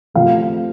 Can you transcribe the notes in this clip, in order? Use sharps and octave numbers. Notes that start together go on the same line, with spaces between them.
C3 F3 A3 F5